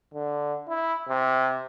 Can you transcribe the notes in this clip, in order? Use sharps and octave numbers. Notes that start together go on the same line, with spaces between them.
D3
E4
C3